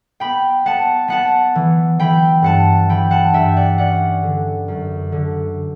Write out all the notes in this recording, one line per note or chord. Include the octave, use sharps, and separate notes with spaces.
B3 G5 B5
B3 F#5 A5
B3 F#5 A5
E3
E3 G5 B5
G2 F#5 A5
E3 G5 B5
F#5 A5
G2 E5 G5
D5 F#5
C#4 D5 F#5
D3
F#2
D3